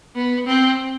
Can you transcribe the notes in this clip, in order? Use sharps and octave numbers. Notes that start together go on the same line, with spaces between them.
B3
C4